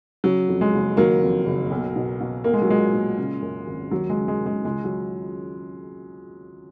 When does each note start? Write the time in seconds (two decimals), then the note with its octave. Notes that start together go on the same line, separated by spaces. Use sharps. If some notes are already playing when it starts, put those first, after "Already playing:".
0.24 C#3 F#3
0.49 F2
0.61 G#3
0.74 F#1
0.97 D#3 F#3 A#3
1.23 F2
1.46 F#1
1.71 B1
1.96 B2
2.20 B2
2.44 B1 A#3
2.54 G#3
2.62 F#3
2.68 A#2 G#3
2.93 A#2
3.18 C#3
3.42 F#2
3.67 G#1
3.91 D#2 F#3
4.10 G#3
4.17 C#3
4.28 G#3
4.40 C#3
4.46 G#3
4.65 C#2 G#3
4.84 F#3